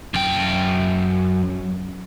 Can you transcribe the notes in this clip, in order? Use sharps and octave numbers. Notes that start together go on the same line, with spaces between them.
F#2 G5